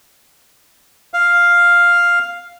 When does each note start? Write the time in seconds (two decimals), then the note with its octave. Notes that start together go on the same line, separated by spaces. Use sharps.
1.14 F5